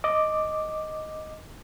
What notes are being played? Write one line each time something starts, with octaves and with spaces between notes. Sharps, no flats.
D#5 D6